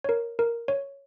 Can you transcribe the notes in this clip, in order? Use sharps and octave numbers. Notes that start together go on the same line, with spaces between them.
C#5
A#4
A#4
C#5